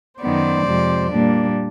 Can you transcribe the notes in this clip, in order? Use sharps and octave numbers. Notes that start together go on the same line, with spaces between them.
F#2 D#3 F#3 B3 C5 D5
F2 C3 F3 G#3
A#2 G3 A#3 D4